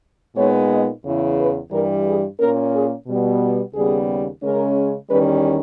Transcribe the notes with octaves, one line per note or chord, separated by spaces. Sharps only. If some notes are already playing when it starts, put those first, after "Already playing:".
A#2 G#3 B3 D#4 C#5
D#5
E2 C#3 E3
B4
G2 E3 G3 A#4
G#4
A#2 A#3 C#4 A#4
G#4
B2 G3 B3
D#2 C#3 G3 B3 G#4
C#3 G#3 C#4 A#4
E2 D#3 G3 C#4 B4